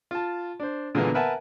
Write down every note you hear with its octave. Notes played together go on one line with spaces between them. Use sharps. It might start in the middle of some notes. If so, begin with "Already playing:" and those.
F4 A5
D4 C5
A#2 D3 E3 G#3 A#3 B3
A#4 B4 E5 F#5 G#5 A5